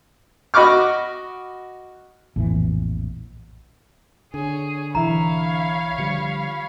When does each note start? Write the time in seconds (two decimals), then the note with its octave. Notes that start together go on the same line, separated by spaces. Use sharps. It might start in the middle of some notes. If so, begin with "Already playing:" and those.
0.54 F#4 D#5 B5 C#6 D6 F6
2.36 A#1 F2 A2 E3
4.34 D3 G#4 C#5
4.95 B1 E3 C#5 E5 F5 A#5 B5
5.98 D3 F3 G3 C#7